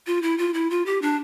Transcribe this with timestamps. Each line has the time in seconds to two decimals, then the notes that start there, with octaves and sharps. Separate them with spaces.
0.07 F4
0.22 E4
0.38 F4
0.54 E4
0.70 F4
0.86 G4
1.02 D4